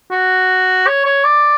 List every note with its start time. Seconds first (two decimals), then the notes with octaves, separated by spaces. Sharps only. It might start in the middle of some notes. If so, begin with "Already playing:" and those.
0.11 F#4
0.87 C#5
1.05 C#5
1.24 D5